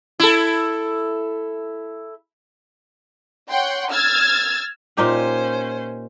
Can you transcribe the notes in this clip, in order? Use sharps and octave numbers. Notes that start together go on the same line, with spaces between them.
E4 A4
C#5 F#5 G5 C6
E6 F6 G#6 A6
A#2 C#4 D#4 G4 C5